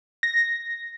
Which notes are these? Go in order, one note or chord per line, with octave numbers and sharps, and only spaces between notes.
A#6